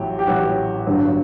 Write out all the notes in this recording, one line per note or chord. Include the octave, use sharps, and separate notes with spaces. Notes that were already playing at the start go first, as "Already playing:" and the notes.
Already playing: A1 A2 F#3 G4
G4
A1 A2 F#3 F#4
G1 G2 D3 F#3